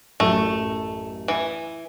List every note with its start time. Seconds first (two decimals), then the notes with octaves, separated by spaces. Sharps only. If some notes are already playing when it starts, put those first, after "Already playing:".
0.20 A1 F#2 A3
1.28 E3